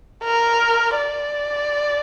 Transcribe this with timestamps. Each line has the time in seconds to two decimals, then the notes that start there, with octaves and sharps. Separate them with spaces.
0.24 A#4
0.96 D5